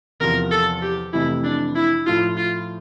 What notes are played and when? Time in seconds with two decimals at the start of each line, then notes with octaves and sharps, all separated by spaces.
0.20 E2 C3 F3 C4 A#4
0.51 A4
0.82 G4
1.13 F2 C3 E3 A3 E4
1.44 D4
1.76 E4
2.06 A2 F3 A3 E4 F4
2.37 F4